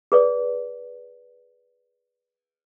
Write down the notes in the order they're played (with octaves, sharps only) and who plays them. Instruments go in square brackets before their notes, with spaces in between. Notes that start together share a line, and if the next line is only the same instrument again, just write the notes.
[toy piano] G#4 B4 D5